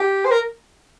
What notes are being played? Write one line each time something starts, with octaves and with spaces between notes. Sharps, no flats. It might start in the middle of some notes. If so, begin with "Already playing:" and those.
Already playing: G4
C5
A#4